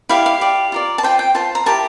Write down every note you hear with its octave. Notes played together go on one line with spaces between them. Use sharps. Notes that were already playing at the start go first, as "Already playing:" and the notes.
E4 G4 D5 F5
F5
G4 D5
F4 A#4 D5
A5
F4 C5 G5
G5
F4 C5 A5
A#5
E4 G4 A#4 A5